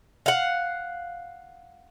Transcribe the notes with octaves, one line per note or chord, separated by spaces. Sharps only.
F5 F#5